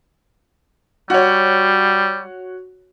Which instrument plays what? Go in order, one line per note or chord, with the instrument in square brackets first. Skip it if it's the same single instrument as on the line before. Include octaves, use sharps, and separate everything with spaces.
[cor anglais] G3 [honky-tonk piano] F#4 C#5